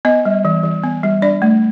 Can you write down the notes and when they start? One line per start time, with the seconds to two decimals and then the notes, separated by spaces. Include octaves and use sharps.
0.05 B3 D#5
0.25 G3
0.45 E3
0.63 E3
0.84 B3
1.03 G3
1.22 D4 D5
1.42 A3